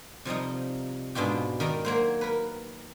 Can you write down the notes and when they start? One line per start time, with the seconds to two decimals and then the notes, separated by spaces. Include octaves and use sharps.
0.25 C3 F3 G3 D#4
1.15 G#2 B2 D4 F4 G4
1.60 D#3 A#4 D5 A#5
1.85 F#3 A#3 C5
2.21 A#4 B4